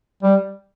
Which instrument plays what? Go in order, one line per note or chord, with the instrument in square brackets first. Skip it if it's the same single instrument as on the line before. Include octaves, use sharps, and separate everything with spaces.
[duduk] G3